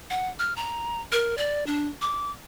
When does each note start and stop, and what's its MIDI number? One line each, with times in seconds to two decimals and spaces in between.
0.10 0.29 78
0.39 0.55 89
0.56 1.01 82
1.12 1.35 70
1.38 1.64 74
1.67 1.88 62
2.01 2.31 86